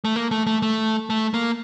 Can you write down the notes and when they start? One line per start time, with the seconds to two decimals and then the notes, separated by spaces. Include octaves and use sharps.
0.05 A3
0.16 A#3
0.31 A3
0.47 A3
0.62 A3
1.10 A3
1.34 A#3